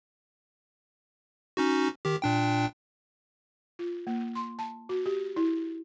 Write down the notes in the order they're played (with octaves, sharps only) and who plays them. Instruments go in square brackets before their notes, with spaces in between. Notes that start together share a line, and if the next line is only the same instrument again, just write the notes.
[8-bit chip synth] C#4 D#4 F#4
D#3 G4
A#2 D4 G5
[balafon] F4
A#3
C6
A5
F#4
G4
E4